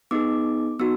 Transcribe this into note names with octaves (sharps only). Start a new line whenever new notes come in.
B3 D#4 G#4 D6
B3 D#4 F#4 E6